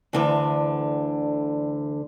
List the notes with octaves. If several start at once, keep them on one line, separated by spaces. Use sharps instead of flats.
D2 D3 E3